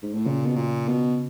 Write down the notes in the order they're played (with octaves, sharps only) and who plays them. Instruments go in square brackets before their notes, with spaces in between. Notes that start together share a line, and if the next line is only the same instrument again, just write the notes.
[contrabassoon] G#2
A2
[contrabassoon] A#2 [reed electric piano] C#3
[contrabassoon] B2
A#2
B2